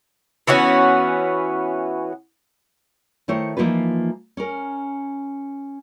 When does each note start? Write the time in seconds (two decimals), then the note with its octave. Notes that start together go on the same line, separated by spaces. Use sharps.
0.47 E3 B3 C#4 F#4
3.28 D#3 A3 E4 C5 C#5
3.57 E3 F3 A#3 D#4 F4 B4
4.37 C#4 A#4